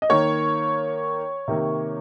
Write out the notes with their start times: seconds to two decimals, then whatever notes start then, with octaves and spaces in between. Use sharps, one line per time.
0.02 D#5
0.09 D#3 A#3 C#5
1.48 C3 D#3 A#3